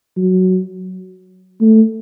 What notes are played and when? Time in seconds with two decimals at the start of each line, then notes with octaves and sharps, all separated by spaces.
0.17 F#3
1.61 A3